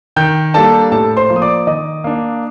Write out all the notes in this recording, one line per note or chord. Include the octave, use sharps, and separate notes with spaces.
D#3 G5 G6
G3 A#3 D4 A4 A5
A2 A4 A5
C5 C6
F3 A#3
D#6
D5 D6
D#3 D#5 D#6
A#3 D4